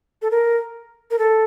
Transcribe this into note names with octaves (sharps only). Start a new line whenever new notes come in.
A4
A#4
A#4
A4